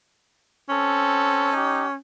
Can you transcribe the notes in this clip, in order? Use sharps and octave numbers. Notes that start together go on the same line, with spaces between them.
C4 C#4 A4
D#4 G4